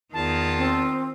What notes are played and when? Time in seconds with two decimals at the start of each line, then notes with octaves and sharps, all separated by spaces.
0.13 E2 D#3 F4 A5
0.58 C4